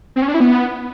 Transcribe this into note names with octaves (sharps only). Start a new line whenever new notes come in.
C4
C#4
D4
E4
B3